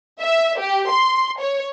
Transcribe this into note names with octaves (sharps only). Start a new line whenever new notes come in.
E5
G4
C6
C#5